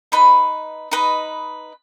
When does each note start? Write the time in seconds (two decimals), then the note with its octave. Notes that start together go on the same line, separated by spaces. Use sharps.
0.12 D#4 B4 D#5 B5
0.91 D#4 B4 D#5 B5